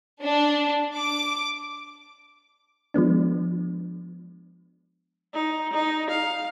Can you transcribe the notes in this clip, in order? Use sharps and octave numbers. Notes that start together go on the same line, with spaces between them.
D4
D6
F3 G#3 B3 D4
D#4
D#4
F5